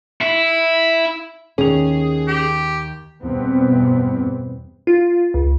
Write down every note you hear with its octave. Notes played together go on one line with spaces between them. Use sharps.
E4
D#2 C#4 G#4 F7
G4
E2 G2 B2 B3 C4
F4
C#2